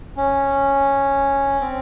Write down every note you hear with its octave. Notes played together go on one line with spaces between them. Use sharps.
C#4
C4